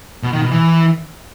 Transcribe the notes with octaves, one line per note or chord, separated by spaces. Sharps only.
B2
D#3
B2
E3